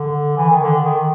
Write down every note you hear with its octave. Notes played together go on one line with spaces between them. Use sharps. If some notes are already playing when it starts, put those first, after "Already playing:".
Already playing: D3
E3
D#3
D3
D#3